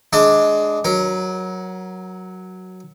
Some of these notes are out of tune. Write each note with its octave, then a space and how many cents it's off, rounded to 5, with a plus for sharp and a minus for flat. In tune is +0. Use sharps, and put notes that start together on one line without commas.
G#3 +15 D4 +0 A5 +45
F#3 +0 A#4 +20